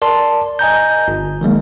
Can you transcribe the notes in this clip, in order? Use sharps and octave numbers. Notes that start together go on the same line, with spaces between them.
A#4 D5 A5 C6
D#5 G#5 A#5 G6
G1
D#3 F#3 G#3 A#3